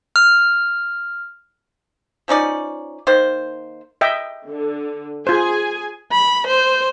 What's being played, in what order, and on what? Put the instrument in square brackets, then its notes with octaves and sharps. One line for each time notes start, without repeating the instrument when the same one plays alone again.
[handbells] F6
[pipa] F3 C#4 D#4 D5
D#3 A#3 C5
[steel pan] D#5 E5 G5
[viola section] D3
[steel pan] F4 C5 [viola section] G#4 G#5
[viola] B5
C5